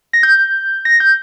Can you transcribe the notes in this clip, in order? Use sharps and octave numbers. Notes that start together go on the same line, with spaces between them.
A#6
G6
A#6
G6